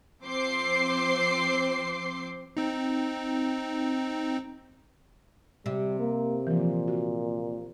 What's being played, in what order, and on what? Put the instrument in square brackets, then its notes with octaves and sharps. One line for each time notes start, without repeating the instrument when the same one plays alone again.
[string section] F3 C4 C5 C6 D6 C7
[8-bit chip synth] C4 D#4
[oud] C3 [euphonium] G3
[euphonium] A#3
[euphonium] A#2 [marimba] E3 F3
[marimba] F#4